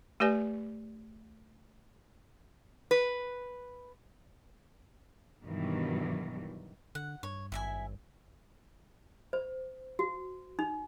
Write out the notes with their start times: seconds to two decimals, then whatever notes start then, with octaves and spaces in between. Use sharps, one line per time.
0.20 A3 G4 B4 D5 G#5
2.91 B4
5.43 G2 B2 D#3 E3 F#3 G3
6.95 D3 F#5
7.23 G2 C#5
7.52 G#1 E4 E5 G#5
9.33 C5
9.99 F#4
10.59 D#4